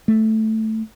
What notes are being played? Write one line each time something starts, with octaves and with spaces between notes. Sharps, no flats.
A3